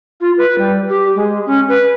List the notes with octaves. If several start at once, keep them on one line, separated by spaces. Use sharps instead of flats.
F4
B4
G3
G4
G#3
C#4
B4